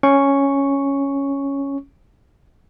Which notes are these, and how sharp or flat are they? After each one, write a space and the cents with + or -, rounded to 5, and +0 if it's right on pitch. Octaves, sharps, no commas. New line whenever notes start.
C#4 +0 C#6 +0